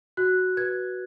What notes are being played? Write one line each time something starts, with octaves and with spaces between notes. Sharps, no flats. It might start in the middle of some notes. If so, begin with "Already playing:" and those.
F#4 F#6
B4 G#6